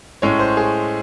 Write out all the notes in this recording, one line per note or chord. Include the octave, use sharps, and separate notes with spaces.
A2 G#3 C#4 C#5
C5
G#4